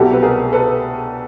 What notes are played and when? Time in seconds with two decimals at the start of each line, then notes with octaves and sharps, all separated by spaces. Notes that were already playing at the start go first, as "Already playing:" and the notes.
Already playing: C2 B2 F#3 G4 A4
0.13 B4
0.22 G#4 A#4
0.53 A4 B4